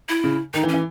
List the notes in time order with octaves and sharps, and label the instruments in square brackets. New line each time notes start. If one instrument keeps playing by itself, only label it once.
[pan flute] E4
[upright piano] C#3
[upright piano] D#3 [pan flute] D#4
[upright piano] E3
[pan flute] C#4
[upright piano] E3